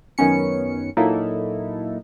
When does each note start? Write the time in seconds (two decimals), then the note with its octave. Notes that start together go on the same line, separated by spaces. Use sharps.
0.18 F#2 D#3 B3 C#4 C#7
0.97 A#2 F#3 A#3 D#4 E4 A4